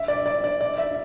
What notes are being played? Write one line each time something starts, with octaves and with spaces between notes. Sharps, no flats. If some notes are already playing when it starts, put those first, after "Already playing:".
Already playing: E5
D5
D5
D5
D5
E5